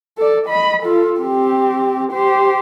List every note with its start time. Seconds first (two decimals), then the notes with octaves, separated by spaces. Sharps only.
0.18 A4 D5
0.46 D#5 B5
0.83 F4 A4
1.20 C4 G4
2.12 G4 C5